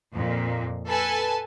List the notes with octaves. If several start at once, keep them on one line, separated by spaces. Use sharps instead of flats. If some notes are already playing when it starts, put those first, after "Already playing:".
F2 A#2
A4 B4 G#5 A5